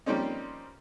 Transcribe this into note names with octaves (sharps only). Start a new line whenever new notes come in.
F3 G3 A#3 C4 C#4 D#4